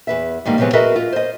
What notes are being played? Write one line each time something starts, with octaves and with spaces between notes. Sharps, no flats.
E2 B4 E5
G#2 D#3 G3 A#3
C3 F3 F#3 G#3 B3 C4
F#4 G#4 A#4 B4 D#5 E5
F4
C5 D#5